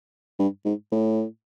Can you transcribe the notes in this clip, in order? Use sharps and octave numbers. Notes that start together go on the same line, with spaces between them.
G2
G#2
A2